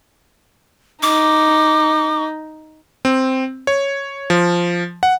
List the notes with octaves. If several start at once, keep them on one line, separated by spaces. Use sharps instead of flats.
D#4 D6
C4
C#5
F3
F#5